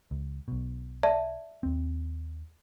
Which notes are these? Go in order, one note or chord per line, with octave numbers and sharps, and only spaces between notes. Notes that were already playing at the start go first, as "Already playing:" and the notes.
C#2
B1 B2
D5 E5 A5
D#2 C4